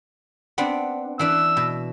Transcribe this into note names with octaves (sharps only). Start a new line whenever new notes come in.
B3 C4 D4
E3 D4 B4 E6
B2